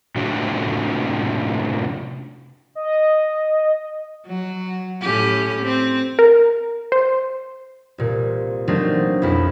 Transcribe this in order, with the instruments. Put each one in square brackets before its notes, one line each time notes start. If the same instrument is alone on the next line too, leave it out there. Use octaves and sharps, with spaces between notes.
[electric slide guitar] A2 C3 F3 C#4 D4 F#4
[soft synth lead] D#5
[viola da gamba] F#3
A2 C#4 G4
C4
[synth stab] A#4
C5
[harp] C2 A#2
F#3 A3 A#3 C4 D4 D#4
B1 F2 E4